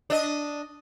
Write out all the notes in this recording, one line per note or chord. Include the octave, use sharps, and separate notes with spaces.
D4 D#5